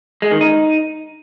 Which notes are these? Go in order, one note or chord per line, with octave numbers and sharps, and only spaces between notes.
G#3
D#3
D#4